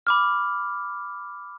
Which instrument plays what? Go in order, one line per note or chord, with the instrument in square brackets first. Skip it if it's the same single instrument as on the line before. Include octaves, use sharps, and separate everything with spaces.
[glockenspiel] B5 D6 F6